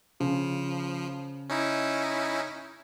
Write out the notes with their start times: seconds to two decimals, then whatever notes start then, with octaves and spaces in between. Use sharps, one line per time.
0.20 C#3 F3
1.50 C#4 D#4 E4